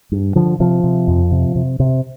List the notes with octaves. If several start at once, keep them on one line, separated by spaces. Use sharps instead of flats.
G2
D3 F3
C3 F3
C3
F2
C3
C3
C3